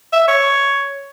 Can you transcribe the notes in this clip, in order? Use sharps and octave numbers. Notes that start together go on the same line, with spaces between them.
E5
C#5